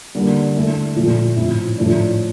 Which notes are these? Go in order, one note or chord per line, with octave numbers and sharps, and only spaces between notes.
D3 G3 A#3
D3 A3 E4
A#2 F3 A3
A2 F3 C4 E4
A2 F3 A3 D4